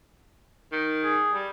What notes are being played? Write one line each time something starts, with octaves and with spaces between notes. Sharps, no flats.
D#3
G#4
G3